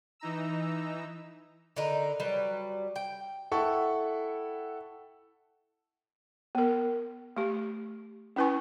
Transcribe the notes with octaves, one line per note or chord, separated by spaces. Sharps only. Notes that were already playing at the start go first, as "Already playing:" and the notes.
E3 D#4 A#5 E6
D3 D#4 A#4 B4
F#3 G3 B4
G5
E4 A4 F#5 G5 C#6
B3 A#4
A3 G4
C#4 E4 B4 G#5 C#6